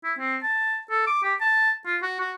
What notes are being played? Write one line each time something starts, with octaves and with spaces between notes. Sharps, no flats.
E4
C4
A5
A4
D6
G4
A5
F4
F#4
F#4